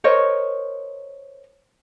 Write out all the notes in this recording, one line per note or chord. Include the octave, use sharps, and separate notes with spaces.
A#4 C5 C#5 D#5